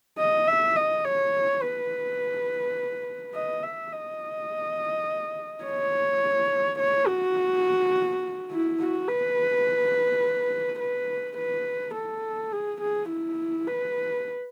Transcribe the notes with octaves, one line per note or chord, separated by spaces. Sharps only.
D#5
E5
D#5
C#5
B4
D#5
E5
D#5
C#5
C#5
F#4
E4
F#4
B4
B4
B4
A4
G#4
G#4
E4
B4